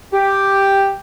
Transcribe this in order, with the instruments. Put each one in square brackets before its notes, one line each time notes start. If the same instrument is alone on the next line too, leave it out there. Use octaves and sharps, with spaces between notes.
[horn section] G4